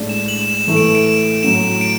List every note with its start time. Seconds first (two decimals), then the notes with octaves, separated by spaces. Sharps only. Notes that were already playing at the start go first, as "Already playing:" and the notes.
Already playing: A2 G#3 D4
0.09 E7
0.24 E7
0.28 F#7
0.42 E7
0.54 E7
0.67 A2 E3 A3 E7
0.76 D7
0.85 E7
0.95 D7
1.05 E7
1.43 A2 F#3 C#4 E7
1.81 D7